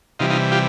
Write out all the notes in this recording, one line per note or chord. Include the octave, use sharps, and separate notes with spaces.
C3 E3 G3 D#4 F4
D#4 F4
F4 G4